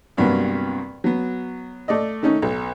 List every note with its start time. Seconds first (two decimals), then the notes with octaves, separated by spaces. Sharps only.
0.17 C2 G2 C3 F#3 A#3 B3
1.04 F#3 B3
1.88 A3 D5 D#5
2.22 D#3 A3 C#4 D#4
2.42 B1